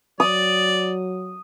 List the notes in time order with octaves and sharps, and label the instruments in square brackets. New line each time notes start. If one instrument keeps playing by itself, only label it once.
[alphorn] F#3 [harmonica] D5 [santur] D#6